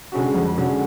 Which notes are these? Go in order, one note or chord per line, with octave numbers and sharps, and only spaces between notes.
D3 G#3 C#4 F#4
F2
D3 G#3 C#4 F#4